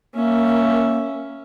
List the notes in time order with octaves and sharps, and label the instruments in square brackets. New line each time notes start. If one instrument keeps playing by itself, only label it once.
[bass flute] A#3 [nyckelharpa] C#4 E5